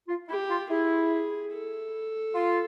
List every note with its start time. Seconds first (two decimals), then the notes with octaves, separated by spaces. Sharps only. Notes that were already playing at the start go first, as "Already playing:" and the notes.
0.09 F4
0.29 E4 G4
0.50 F4
0.70 E4 G#4
1.53 A4
2.35 F4